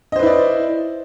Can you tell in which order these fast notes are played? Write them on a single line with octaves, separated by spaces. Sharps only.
D#5 C5 B4 E4 D5